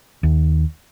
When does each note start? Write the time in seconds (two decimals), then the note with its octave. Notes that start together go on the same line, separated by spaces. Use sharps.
0.23 D#2